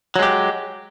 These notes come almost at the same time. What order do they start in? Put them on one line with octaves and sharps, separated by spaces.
F#3 G#3 G4